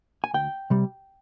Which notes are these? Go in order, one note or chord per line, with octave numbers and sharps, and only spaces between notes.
G#5
D2 G5
C3 G3